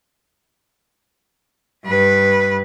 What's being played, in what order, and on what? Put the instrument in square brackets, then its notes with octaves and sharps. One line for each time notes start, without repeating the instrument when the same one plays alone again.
[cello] G2 B4